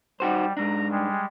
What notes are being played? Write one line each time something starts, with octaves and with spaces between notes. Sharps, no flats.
G3 D#4 F#4 C5
G#2 D4 A#5
G3 G#3